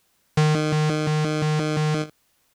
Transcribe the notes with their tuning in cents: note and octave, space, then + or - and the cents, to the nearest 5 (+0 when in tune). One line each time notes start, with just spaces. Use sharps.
D#3 -25